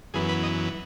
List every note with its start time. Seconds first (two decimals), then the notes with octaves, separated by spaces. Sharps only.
0.14 F#2 E3 B3 G#4
0.29 B4
0.43 D#5